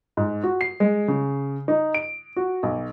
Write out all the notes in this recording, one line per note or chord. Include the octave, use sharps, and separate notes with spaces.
G#2
F#4
C7
G#3
C#3
D#4
D7
F#4
B1